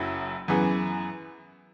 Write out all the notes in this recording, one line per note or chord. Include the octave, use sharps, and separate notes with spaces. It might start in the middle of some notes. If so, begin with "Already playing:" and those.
Already playing: F#1 F#2 F#3 E4
F#2 E3 B3 G#4